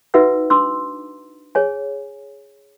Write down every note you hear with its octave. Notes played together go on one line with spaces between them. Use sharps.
D#4 F#4 B4 E5 F#5 E6
D4 C6 D6 E6
G#4 C#5 G#5